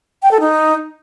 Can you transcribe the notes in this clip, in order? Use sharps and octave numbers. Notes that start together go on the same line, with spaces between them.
G5
A4
D#4